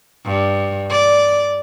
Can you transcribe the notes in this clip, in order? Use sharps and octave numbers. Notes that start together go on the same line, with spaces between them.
G2
D5